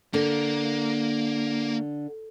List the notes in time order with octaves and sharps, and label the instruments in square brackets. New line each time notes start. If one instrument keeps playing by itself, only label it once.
[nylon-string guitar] D3 [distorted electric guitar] A#3